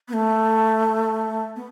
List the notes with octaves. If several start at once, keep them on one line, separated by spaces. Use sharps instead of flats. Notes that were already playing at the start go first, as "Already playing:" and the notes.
B3
A3
B3